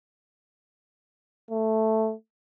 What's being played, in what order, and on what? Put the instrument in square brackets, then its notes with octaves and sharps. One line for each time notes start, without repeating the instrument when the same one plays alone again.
[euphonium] A3